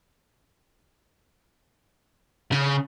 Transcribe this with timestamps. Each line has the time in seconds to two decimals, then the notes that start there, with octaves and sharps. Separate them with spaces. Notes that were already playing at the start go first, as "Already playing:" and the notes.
2.52 C#3